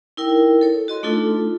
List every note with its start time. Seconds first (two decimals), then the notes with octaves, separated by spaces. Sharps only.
0.17 D#4 E4 A#4 G5
0.61 A4 C#5
0.88 F#4 D#5 C6
1.03 A3 D4 D#4 F4 A4